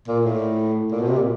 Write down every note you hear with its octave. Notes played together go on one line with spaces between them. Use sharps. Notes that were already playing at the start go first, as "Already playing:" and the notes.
A#2
A2
A#2
B2
C3
A#2